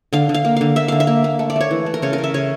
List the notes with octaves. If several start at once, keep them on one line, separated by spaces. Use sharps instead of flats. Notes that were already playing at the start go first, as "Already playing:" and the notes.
D3 F5
D3
F5
A#3
D3 F5
A#3 E5
D3 F5
E5
A#3
A#3
A3
D5
A3 C#5
E3
A3
A#4
C#3 C#5
A#4
C#3
E5
C#3 C#5